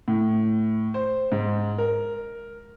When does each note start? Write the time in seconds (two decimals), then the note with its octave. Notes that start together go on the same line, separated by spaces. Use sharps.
0.08 A2
0.94 C5
1.32 G#2
1.78 A#4